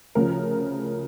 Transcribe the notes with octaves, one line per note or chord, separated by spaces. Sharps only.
D2 C#3 F3 A#4